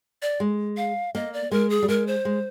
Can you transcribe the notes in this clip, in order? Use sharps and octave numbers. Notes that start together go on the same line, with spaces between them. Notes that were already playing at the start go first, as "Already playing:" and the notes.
D5
G#3
F5
A#3 D#5
D5
G#3 A#4
G#4
G3
G#3 A#4
C5
G#3